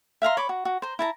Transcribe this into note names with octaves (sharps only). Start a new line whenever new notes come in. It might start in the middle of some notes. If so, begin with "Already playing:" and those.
E5 F5 A#5 C6
C#5 B5 D6
F#4
F#4
C5 A#5
E4 A5 A#5